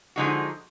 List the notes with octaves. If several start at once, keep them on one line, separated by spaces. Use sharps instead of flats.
D3 F3 G#3 D#4 F#4